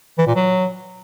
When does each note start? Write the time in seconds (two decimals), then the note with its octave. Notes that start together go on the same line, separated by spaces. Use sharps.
0.18 E3
0.27 A#2
0.36 F#3